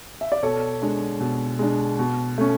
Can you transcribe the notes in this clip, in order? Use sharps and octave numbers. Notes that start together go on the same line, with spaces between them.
E5
D5
B2 A4 C#5
G#3 D4
B2
G#3 D4
B2
A3 C#4